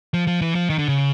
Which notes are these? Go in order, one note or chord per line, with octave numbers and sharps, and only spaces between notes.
F3
F3
E3
F3
D#3
D3
C#3